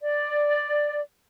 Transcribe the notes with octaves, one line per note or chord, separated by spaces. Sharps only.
D5